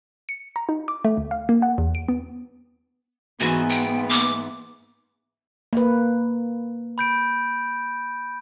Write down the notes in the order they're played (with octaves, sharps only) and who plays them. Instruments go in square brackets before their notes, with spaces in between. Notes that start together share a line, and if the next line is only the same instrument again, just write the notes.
[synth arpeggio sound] C#7
A#5
D#4
D6
A3
D2
F5
A#3
F#5
E2
D7
B3
[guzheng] G#2 E3 G#5 [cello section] B3 [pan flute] F#4
[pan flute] G5
D6
[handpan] A#3 B4
[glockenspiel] B5 G6 D7